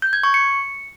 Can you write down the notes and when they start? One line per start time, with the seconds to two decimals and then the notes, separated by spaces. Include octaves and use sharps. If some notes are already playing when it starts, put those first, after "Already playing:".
0.02 G6
0.13 G#6
0.23 C#6
0.34 C#7